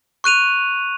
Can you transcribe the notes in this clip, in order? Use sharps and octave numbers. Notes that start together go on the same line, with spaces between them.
C#6 F#6 D#7 F7